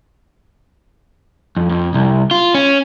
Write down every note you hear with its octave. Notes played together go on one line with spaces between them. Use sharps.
F2
F2
C2
F4
C#4